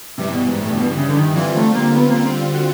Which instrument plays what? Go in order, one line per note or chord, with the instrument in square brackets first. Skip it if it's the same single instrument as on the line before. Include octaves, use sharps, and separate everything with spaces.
[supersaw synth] G2 E3 G3 [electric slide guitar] C3
[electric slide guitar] B2
G#2
A2
C3
B2
C3
C#3
D3
D#3
[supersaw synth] D3 G3 C4 F4 [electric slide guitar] E3
[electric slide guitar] A3
A#3
B3
A#3
C4
F#4